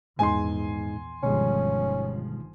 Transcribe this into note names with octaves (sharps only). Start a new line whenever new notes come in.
A#1 E2 G#2 G#3 D#4 G#5 C6
G1 B2 D#3 F3 G3 G#3 C#4